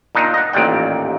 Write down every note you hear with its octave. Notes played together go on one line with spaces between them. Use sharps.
A#2 D4 D#4
D#5 F#5
A1 D#2 A#2 D5 G5